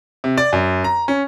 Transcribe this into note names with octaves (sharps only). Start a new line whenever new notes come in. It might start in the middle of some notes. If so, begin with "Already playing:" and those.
C3
D5
F#2
A#5
C#4